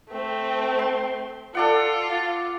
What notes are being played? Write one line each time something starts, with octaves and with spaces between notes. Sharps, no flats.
A3 C4
C6
F4 A4 D5 F#5